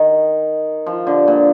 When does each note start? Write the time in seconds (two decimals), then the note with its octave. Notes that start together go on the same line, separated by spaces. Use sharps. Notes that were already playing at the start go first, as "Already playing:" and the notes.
Already playing: D#3
0.86 F3
1.07 D3
1.28 A#2